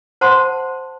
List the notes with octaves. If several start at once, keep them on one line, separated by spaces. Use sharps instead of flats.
C5 F#5 A5 C6